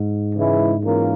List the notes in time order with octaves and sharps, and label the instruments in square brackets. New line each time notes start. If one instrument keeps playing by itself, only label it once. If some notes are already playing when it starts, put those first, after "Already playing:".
Already playing: [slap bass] G#2
[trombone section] C#3 E3 G#3 E4
E3 A#3 C#4 F4 A#4